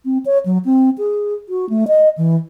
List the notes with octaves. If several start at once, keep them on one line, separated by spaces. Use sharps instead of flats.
C4
C#5
F#3
C4
G#4
F#4
A3
D#5
E3